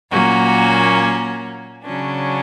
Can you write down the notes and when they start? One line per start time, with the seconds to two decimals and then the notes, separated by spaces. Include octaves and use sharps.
0.10 A#2 F#3 A#3 C#4 F#4
1.84 C#3 F#3 C#4 D4